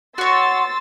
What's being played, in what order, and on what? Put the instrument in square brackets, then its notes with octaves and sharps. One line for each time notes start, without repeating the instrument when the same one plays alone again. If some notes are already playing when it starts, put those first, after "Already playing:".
[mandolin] F#4 C#5 [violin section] C6 E6 A6